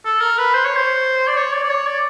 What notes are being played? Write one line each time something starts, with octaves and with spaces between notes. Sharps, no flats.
A4
A#4
B4
C5
C#5
C5
D5
C#5
D5
D5
C#5
D5